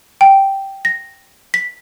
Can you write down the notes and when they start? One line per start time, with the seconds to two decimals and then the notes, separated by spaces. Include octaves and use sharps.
0.21 G5
0.85 A#6
1.54 B6